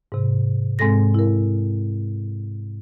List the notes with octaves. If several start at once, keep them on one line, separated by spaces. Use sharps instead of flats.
G#2 C3
G#2 G#3 C4 A4 A#6
E4 A#4